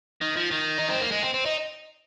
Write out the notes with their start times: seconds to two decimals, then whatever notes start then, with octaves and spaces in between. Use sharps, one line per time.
0.22 D#3
0.37 F3
0.51 D#3
0.79 D#4
0.90 C4
1.01 A#3
1.12 G#3
1.23 C4
1.34 C4
1.46 D#4